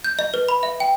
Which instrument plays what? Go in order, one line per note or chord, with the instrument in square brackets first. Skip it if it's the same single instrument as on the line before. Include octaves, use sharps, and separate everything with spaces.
[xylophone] G6
D#5
B4
B5
E5
G5